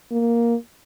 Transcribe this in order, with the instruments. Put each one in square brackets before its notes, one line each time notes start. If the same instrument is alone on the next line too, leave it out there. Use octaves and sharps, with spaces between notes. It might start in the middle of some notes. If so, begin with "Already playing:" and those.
[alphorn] A#3